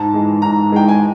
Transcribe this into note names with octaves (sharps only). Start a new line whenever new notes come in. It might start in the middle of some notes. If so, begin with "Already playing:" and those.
Already playing: G#2 A5
E3 G#3
G#2 A#5
E3 G#3 G5
G#5